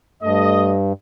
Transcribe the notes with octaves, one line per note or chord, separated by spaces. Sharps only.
G2 A3 D#5